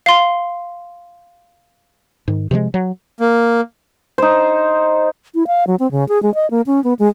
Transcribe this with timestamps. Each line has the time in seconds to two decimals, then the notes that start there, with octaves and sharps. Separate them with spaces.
0.06 F5 C6
2.28 G#2 D#3
2.51 C3 F3 G3 G#3
2.74 F#3
3.20 A#3
4.18 D#4 C5
5.35 E4
5.47 F5
5.67 F#3
5.80 C4
5.91 C#3
6.09 G#4
6.23 G#3
6.35 D#5
6.51 A#3
6.66 C#4
6.84 B3
6.99 G#3